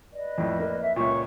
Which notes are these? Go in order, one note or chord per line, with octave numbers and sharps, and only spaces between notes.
B4 D5 D#5
F2 A2
A#3
E5
C#2 A#2 C#5 C#6